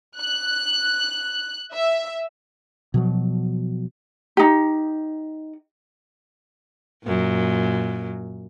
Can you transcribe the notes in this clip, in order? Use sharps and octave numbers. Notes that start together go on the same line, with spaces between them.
F#6
E5
B2 F3 F#3
D#4 G4
F#2 A#2